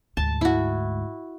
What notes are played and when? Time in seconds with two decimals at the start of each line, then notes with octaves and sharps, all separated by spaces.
0.17 D2 G#2 A5
0.41 E4 F#4